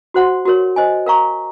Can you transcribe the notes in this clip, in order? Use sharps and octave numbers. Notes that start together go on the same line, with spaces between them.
F#4 C5 F#5 C6
F#4 A#4 C#5
C5 D#5 G#5
A#4 F5 A#5 C#6